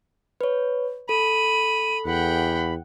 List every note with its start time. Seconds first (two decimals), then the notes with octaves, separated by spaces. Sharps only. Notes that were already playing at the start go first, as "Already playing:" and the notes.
0.41 B4 C#5
1.09 A4 B5 D#7
2.06 E2 F#5 G5 B5